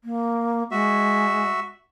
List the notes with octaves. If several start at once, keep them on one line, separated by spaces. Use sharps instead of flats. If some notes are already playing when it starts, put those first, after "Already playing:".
A#3
G#3 F#4 E5